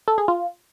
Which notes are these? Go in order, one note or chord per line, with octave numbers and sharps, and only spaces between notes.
A4
G#4
F4